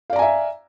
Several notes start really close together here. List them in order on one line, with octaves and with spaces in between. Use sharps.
F5 D5 A#5 G#5 E5